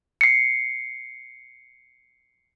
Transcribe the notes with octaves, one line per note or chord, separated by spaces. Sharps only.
C7 C#7